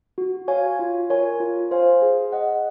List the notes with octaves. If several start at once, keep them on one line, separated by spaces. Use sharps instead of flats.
F#4
C#5 F5 G#5
F4
A#4 C#5 G#5
F4
C5 F5 G#5
G#4
D#5 F#5